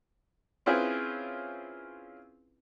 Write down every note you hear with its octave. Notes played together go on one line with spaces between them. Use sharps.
C4 C#4 E4 F4 G#4 B4